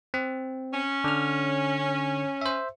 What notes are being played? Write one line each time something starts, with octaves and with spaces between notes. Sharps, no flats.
C4
C#4
D3 F6
C5 E5